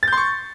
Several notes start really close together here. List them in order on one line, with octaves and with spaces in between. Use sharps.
A6 G6 C6 C#6